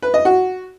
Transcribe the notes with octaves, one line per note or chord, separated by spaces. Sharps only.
B4
D#5
F#4